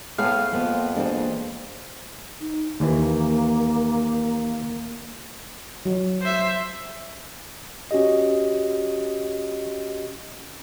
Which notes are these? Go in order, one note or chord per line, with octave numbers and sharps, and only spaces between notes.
A2 B3 G#4 F5
F2 F3 A#3 B3
E3 G#3 A#3 D4 C5
D#4
D#2 E3 A#3
F#3
C5 E5
C#4 F#4 G4 D#5